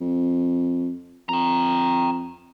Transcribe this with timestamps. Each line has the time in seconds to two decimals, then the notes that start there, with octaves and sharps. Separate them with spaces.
0.01 F2
1.29 F2 G5 A#5